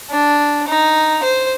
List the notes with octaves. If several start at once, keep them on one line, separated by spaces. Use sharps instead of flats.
D4
D#4
C5